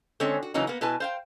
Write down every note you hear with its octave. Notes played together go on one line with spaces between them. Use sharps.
D3 G#3 C4 C#4 C#5
F#4
C#3 E3 F#3 A#3 C#4 D#4
A#3 B3
B2 E4 B4 G#5 A5
C5 F5 G5